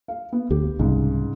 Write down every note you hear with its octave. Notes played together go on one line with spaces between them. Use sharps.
F5
B3
D2 G4
C2 G#2 C#3